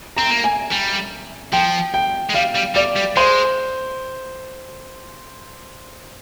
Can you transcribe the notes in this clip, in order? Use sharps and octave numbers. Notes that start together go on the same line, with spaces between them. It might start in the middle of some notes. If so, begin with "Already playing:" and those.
C4 A#5
A#3
G#5
G3
F3 G5
G5
G#3
G3 F5
G3
G3 D5
G3
G#3 C5